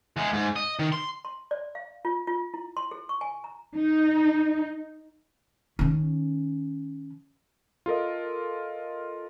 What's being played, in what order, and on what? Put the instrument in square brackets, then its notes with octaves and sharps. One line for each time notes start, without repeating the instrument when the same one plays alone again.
[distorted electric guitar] E2 G#3
G#2
D#5
D#3
C6
[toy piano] C6
D5
F5
F4
F4
E4
C6
G#4
C#6
G#5
A#5
[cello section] D#4
[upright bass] D#3 C#4
[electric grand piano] F4 A4 A#4 D#5